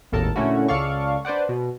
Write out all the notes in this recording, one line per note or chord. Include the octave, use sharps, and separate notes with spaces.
G#1 D#2 A2 A4 A#4 A5
A#2 D3 A3 C#4 E4 F#4
C#2 A4 D5 F5 C#6
D4 B4 C5 D5 F#5
B2